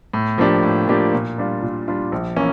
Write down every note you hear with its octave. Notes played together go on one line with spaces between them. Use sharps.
A2
F3 A#3 D4 G4
A2
F3 A#3 D4 G4
A#2
G3 D4 F4
A#2
G3 D4 F4
A#1
E3 A#3 C#4